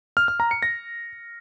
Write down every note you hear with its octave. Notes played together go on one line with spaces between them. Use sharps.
F6
F6
A#5
C#7
A#6